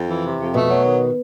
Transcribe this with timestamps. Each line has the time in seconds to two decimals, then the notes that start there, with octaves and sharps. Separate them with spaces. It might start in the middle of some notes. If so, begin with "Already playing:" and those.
Already playing: F2
0.09 E3
0.24 C3
0.39 F2
0.54 B2 A3
0.69 F#3
0.85 D#3